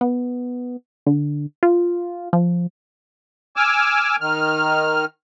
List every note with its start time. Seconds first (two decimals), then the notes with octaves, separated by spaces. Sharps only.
0.01 B3
1.06 D3
1.63 F4
2.33 F3
3.56 G#5 D6 E6 F6
4.21 D#3 F6